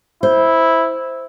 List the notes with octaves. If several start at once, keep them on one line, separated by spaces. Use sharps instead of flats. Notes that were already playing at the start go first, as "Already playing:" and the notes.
E4 C5